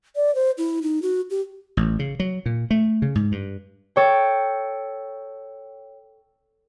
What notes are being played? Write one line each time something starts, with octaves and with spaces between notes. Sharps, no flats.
D5
C5
E4
D#4
F#4
G4
A1
C#3
F#3
A#2
A3
C#3
G#2
G2
A4 C#5 G5